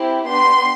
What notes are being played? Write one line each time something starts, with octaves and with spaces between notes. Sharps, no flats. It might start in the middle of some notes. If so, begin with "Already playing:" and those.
Already playing: C4 E4 G4
B3 D4 G4 C6